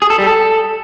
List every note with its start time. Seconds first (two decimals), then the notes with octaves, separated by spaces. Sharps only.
0.02 G#4
0.10 A4
0.18 G3
0.27 A4